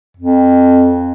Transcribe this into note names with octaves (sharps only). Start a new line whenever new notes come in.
F2